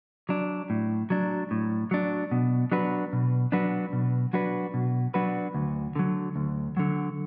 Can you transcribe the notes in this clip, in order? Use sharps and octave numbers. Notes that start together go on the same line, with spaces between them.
F#3 D4
A2
F#3 D4
A2
F#3 D4
B2
F#3 D4 F#4 B4
B2
F#3 D4 F#4 B4
B2
F#3 D4 F#4 B4
B2
F#3 D4 F#4 B4
D2
D3 F#3
D2
D3 F#3